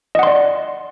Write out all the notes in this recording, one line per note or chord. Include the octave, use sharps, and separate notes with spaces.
D5 D#5 F#5 C6